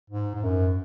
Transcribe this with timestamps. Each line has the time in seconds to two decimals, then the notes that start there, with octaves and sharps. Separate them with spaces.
0.10 G#2
0.35 G#2
0.44 F#2